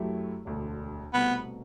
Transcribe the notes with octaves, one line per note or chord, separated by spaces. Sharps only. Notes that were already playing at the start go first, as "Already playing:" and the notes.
Already playing: F#2 F#3 A3 E4 G4
E1 D2 D3
C2 B2 A3 B3 C4